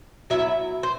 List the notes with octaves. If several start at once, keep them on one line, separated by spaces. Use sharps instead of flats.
F#3 B3 E4 E5
C5